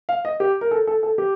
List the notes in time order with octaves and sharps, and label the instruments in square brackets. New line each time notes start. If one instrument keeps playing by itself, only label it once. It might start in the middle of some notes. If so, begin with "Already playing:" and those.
[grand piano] F5
D#5
G4
A#4
A4
A4
A4
G4